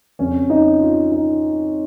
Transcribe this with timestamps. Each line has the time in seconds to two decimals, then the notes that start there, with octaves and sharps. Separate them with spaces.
0.19 F2 C#3 C#4
0.50 D#4
0.81 F4
1.12 D#4